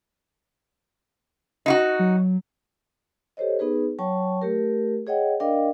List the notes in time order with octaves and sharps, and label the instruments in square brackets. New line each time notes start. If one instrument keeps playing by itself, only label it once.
[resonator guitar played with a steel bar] D#4 F4 F#4
[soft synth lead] F#3
[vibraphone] G4 A4 C5 C#5 D#5
B3 D#4 G#4 B4
F#3 C#5 G5 A5 C#6
A3 G4 A#4
G#4 C#5 D#5 F#5 G5
D4 A#4 D5 D#5 F5 G5